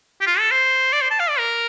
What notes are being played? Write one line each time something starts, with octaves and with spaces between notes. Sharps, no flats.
G4
F4
A4
C5
D5
C5
A5
F5
D5
A#4